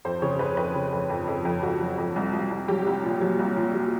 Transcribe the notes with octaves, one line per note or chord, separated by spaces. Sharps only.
F2 C5
C#3 C#5
F2 B4
F2 B4
C#3
F2
F2
F2
F2
F2 F#4
F#3
F2
C2
C2
C2
F#3 G4
C2
A#2
F#3
C2
A#2
F#3